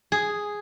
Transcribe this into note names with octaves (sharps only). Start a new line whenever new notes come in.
G#4